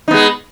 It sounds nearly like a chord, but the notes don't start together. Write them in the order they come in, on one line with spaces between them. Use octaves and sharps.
D#4 B3 G#3